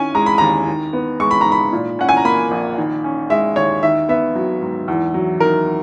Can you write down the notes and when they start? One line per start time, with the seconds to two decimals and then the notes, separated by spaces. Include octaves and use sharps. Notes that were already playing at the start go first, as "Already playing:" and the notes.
Already playing: D#3 C#4 G#5
0.14 G#3 A#5
0.26 B5
0.38 D#2 A#5
0.67 D#3
0.93 B3
1.20 G#3 C#6
1.31 B5
1.41 G#2 A#5
1.52 B5
1.73 A#2
1.99 C#4 F#5
2.09 G#5
2.17 A#5
2.25 A#3 B5
2.51 A#1
2.78 D#3
3.04 C#4
3.30 G#3 E5
3.56 D#2 C#5
3.83 D#3 E5
4.09 B3 E5
4.35 F#3
4.61 G#2
4.88 E2
5.14 F#3
5.40 D#3 A#4